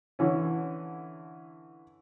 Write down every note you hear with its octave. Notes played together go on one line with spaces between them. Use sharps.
D3 E3 C#4